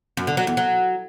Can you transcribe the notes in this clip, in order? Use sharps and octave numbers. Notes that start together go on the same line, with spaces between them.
F#2
D3
F#3
E2
F#3